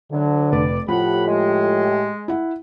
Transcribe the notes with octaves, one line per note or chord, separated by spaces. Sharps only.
D2 D3 F#3
F1 B4 D5
A2 F3 G4 F#5 B5
G#3
E4 F#5